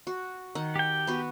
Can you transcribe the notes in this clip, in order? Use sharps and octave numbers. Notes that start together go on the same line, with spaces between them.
F#4
D#3 F#5
G4 G5
B3 F#4